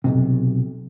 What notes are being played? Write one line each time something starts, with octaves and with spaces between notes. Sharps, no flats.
B1 F#2 C3